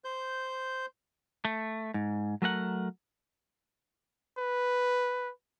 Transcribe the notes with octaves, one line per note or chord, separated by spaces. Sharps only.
C5 G6
A3
G#2
F#3 A3 A#4 F#5
B4